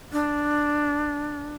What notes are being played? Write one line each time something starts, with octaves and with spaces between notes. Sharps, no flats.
D4